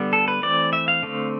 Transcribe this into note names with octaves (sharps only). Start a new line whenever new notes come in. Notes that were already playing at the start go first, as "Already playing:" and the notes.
Already playing: D3 G3 B3
A4
B4
E3 A3 C4 D5
E5
F5
D3 A3 C4